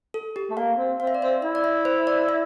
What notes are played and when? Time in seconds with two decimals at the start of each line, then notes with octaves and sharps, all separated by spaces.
0.14 A4
0.36 G4
0.50 A3
0.57 A#3 F5
0.78 C4
1.00 C4 F5
1.07 E5
1.15 D5
1.22 C4 E5
1.42 E4 E5
1.55 D5
1.64 E5
1.85 C5
2.07 D5
2.29 E5